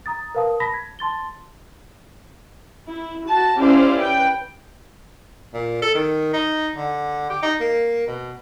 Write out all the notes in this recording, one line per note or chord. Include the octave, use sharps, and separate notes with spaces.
A#5 D#6 A6
A#4 B4 F5 A5 D#6
A5 B5 A#6 B6
G#6
A5 C6 A6 G7
E4
F#4 A5
C#4 E4 G4 C5 D5 F5
B4 G5
A#2
A4
D#3
D#4
D3
G4
D#4
A#3
B2